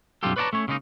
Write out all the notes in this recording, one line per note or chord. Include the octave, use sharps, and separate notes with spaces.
B1 F#2 G3 F4 G4 A4
B4 C#5 D5 F5 A5 A#5
A3 C#4 C#5
C#3 G#3 A#3 B3 D#4